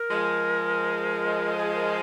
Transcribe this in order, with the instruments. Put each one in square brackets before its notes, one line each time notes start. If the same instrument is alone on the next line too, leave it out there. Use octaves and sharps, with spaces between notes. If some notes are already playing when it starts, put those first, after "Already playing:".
Already playing: [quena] A#4
[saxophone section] F3 G#3
[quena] G#4
A#4